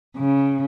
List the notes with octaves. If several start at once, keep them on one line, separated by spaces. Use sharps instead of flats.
C#3